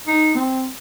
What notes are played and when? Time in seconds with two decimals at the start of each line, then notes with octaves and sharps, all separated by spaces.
0.06 D#4
0.35 C4